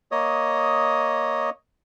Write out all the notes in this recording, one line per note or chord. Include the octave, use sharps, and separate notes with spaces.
A#3 C#5 D#5 D#6